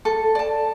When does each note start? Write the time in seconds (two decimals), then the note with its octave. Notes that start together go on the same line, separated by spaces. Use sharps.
0.05 A4
0.35 D5 A5